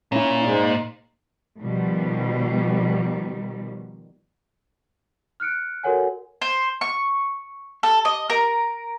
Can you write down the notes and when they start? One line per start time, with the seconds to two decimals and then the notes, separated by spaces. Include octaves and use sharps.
0.12 A#2 C#4 E4
0.44 G#2 G#3 C5 D5
1.60 B2 D#3 F3 G3
5.40 F6 F#6 C#7 D7
5.84 F#4 A4 A#4 C#5 F#5 G#5
6.42 C5
6.81 C#6
7.83 A4
8.05 D#5
8.30 A#4